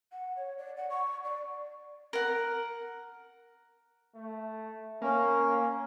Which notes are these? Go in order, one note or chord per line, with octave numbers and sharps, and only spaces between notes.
F#5
C#5
D5
F#5
C#6
D5
A#4 F#5
A3
A#3 C#4 G#5